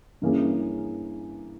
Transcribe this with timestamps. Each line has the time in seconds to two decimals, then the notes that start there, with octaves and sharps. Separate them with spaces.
0.22 G2 E3 A#3 C#4 G#4